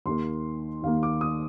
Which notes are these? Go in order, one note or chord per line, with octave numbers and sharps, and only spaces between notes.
D#2 D#3 A#3 C6
D#2 D#3 A#3 F5
D6
D#6